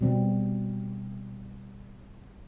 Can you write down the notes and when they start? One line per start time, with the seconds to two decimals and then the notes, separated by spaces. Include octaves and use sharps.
0.01 B2 G3 C4